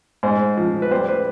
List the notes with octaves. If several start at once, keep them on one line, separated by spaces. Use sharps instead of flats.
G#2 C5
F3
B4
G3 C5
B4